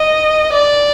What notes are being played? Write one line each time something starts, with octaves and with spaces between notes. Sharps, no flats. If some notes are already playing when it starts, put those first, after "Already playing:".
Already playing: D#5
D5